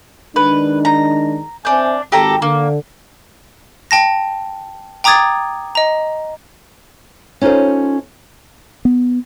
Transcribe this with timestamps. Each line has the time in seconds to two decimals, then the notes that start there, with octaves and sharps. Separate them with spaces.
0.36 D#3 G#3 D4 B4
0.85 A#5
1.65 C4 D4 E5 G#5 G6
2.12 G#1 G4 A4 A#5
2.42 D3 A#3
3.91 G5 A5 A#6
5.04 G5 A#5 D6 D#6 G#6 A6
5.75 D#5 A#5
7.41 C#4 D#4 F4 A4 C5
8.85 B3